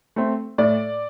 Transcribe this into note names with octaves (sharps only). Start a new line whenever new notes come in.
A3 C4
A2 D5